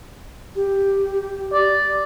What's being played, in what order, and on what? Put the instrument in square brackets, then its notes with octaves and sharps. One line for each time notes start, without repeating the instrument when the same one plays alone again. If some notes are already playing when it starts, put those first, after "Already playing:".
[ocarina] G4
[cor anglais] D5